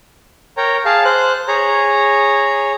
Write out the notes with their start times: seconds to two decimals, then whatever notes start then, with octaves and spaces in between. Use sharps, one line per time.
0.57 A#4 C#5 G5 A#5
0.85 G#4 F5 A5
1.05 C5 F#6
1.48 G#4 C#5 A#5